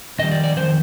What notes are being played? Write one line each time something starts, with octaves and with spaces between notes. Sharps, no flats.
F2 D#3 G3 D#5
D5
D5
F2 D#3 C5